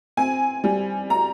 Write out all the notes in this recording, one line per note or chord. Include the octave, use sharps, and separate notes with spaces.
C4 G#5
G3
A#5